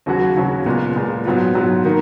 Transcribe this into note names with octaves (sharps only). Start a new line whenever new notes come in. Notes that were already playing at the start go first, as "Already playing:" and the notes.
D#2 C#3 F#3 C#4 F#4
D#2 C#3 F#3 C#4 F#4
A#2 G#3 B3 F4
A#2 G#3 B3 F4
G#2 F#3 B3 F4
G#2 F#3 B3 F4
D#3 A#3